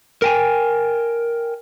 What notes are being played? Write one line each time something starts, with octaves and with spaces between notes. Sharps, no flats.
A#4 G5 G#5